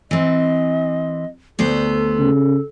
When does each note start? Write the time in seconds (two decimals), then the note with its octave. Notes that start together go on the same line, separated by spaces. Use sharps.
0.11 E3 C4 D#5
1.59 D2 B3 A4 C5
2.19 C#3